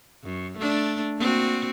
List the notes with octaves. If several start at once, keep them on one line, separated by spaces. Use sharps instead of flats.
F#2
A3 D4
A#3 C4 F#4